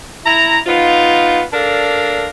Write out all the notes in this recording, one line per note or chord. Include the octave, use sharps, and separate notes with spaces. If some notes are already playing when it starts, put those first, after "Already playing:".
E4 A#5
B3 D#4 F4
D4 A4 A#4 D5 F5